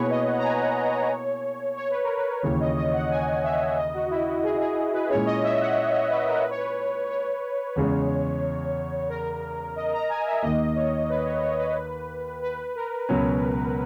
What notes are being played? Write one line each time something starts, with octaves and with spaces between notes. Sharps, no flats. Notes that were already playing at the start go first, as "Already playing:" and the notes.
Already playing: B2 A#3 E4 G#4 B4 C#5
D#5
F#5
A#5
G#5
F#5
D#5
C#5
C#5
B4
A#4
B4
D#2 C#3 E3 C#5
D#5
D#5
F#5
G#5
E5
D#5
F#4
E4
F#4
G#4
G#4
B4
A#2 G#3 C#4 E4 G#4 C#5
D#5
E5
F#5
C#5
B4
A#4
B4
C#5
B4
C#5
E2 C#3 G#3 C#4
A#4
D#5
A#5
G#5
E5
D#2 D#3 A#3 D#5
C#5
B4
C#5
C#5
B4
B4
A#4
C#2 B2 F#3 C#4